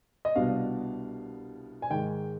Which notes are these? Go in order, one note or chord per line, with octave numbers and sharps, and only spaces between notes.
D#5
C2 B2 B3 D4 F5
G#5
G#2 D#3 G#3 G5